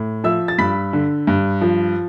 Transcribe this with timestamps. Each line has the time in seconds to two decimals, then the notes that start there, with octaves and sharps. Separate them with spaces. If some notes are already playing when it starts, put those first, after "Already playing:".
Already playing: A2
0.24 F3 E5 E6
0.48 A6
0.58 G2 B5 B6
0.93 D3
1.27 G2
1.61 F3